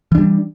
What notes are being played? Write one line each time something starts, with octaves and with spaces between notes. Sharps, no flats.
E3 G3 D4